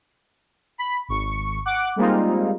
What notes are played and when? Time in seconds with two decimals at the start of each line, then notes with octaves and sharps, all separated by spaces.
0.78 B5
1.08 G#1 C#6
1.65 F#5 D6 F#6
1.96 G3 G#3 A#3 C4 D#4 F4